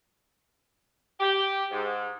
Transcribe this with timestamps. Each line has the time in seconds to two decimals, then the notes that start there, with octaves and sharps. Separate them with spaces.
1.20 G4
1.72 G#2